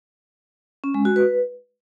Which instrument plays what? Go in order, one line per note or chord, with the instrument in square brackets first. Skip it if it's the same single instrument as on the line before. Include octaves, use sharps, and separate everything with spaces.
[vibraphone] C#4
G#3
F#4
B4